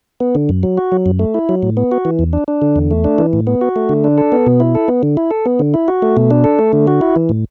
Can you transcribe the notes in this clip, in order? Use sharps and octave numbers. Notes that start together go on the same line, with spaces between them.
B3
D3
F#2
F#3
F#4
F#3
F#2
A3
E4
F#3
A2
B3
F#4
E3
E2
D4
D4
D3
E2
A3
D4
E3
A2
B3
F#4
A3
D3
D4
A4
B3
B2
E4
A4
B3
D3
E4
A4
B3
D3
E4
F#4
A3
B2
D4
A4
A3
D3
F#4
E4
E3
A2